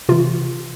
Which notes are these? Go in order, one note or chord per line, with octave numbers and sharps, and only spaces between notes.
C3 E3 F4